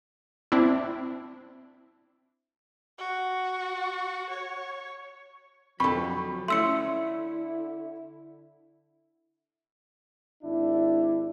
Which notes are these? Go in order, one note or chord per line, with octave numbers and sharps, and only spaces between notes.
C4 D4 E4
F#4
C#5
F2 D3 F3 F#3 A4 B5 C#6
D3 A3 C#4 E4 C6 E6 C#7
G#1 D4 E4